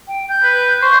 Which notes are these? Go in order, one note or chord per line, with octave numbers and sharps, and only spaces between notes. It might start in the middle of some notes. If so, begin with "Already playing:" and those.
G5
G6
B4
C5 C#6